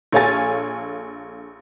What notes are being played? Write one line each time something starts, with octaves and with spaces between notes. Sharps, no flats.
A#1 A4 C#5 F5 G#5 A6